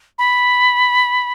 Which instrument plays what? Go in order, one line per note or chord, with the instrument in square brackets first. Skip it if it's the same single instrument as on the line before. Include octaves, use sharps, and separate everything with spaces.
[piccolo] B5